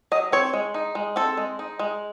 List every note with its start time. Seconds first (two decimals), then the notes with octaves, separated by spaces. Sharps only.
0.12 F#3 D#5
0.32 C4 C#5
0.54 G#3
0.74 D#4
0.95 G#3
1.16 C4 A4
1.37 G#3
1.59 D#4
1.79 G#3